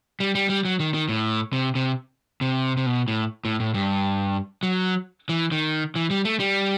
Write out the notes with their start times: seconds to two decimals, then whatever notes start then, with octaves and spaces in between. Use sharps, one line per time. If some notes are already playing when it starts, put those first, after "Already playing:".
0.20 G3
0.35 G3
0.49 G3
0.65 F#3
0.80 D#3
0.94 D#3
1.09 A2
1.53 C3
1.75 C3
2.41 C3
2.77 C3
2.86 B2
3.08 A2
3.45 A2
3.60 A2
3.74 G2
4.63 F#3
5.29 E3
5.52 D#3
5.95 E3
6.10 G3
6.25 A3
6.40 G3